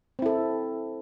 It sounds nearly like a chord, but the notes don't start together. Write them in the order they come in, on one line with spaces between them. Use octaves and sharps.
C4 E4 A4